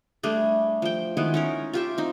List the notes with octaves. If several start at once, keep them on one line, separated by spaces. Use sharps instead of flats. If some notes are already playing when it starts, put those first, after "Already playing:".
G3 A3 D4 G#4
F3 G5
D#3 G#3 B3 E4
C#4 D#4 A#4
F4 G4 E5
C4 D#4